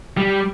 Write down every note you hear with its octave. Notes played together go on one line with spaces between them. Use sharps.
G3